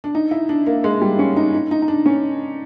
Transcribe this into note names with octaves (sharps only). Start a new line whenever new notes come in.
D4
D#4
E4
D4
A#3
G#3
G3
C#4
D#4
D#4
D#4
D#4
D4
C#4